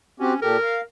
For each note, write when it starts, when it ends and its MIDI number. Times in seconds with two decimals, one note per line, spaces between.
0.20 0.34 60
0.20 0.39 61
0.20 0.34 66
0.20 0.34 67
0.42 0.57 46
0.42 0.57 67
0.42 0.57 69
0.42 0.82 70
0.63 0.81 77